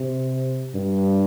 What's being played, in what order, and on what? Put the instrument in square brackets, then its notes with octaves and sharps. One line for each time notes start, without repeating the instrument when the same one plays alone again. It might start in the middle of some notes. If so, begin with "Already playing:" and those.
Already playing: [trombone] C3
G2